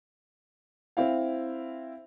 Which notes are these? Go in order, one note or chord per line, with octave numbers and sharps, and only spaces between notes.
C4 E4 F5